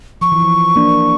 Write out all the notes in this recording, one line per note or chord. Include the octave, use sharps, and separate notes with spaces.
F3 C#6
E3
F3
A#3 D4